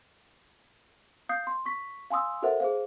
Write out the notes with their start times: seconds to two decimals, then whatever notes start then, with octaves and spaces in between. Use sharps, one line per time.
1.29 F5 D#6 G6 C7
1.47 C6
1.66 C#6 B6
2.10 F5 G#5 C6 D#6 E6
2.42 F#4 A4 A#4 C5 E5 F#5
2.60 G#4 C5 F5